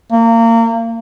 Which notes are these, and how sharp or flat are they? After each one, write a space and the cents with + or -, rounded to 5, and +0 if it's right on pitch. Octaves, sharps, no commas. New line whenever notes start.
A#3 -30